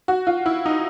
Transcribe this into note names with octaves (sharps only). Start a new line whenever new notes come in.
F#4
F4
E4
D#4